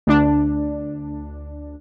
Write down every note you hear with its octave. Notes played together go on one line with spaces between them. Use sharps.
D2 D4